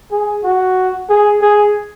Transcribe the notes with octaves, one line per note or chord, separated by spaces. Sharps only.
G#4
F#4
G#4
G#4